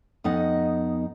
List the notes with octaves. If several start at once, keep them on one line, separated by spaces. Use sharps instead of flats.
F2 B3 D#4 D#5 F#5